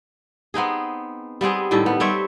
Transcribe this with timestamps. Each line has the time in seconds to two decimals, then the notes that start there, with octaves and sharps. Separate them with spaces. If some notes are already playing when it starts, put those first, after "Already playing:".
0.54 B3 C4 D#4 G#4
1.41 G3 B3 C4 G#4
1.71 A2 D#3 G3 A4
1.86 B3
2.00 G3 C4 C#5 E5